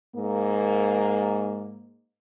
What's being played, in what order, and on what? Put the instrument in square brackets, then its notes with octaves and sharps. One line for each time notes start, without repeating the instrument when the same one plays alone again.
[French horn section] G#2 A#3